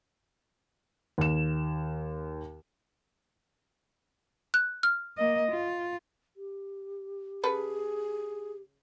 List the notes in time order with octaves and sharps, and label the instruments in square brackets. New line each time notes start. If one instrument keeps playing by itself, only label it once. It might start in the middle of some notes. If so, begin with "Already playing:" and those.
[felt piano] D#2 E7
[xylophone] F#6
F6
[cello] A#3 D#5
F4
[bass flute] G4
[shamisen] C#3 A4 B4 [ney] G#4